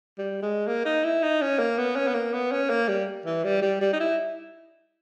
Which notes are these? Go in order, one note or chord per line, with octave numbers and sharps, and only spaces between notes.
G3
G#3
A#3
D#4
E4
D#4
C#4
A#3
B3
C#4
B3
A#3
B3
C#4
A#3
G3
E3
G3
G3
G3
D#4
E4